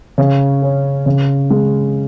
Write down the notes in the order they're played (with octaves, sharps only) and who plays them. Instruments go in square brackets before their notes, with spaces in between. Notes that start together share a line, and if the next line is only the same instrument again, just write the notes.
[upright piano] C#3
C#4
C#3
G#3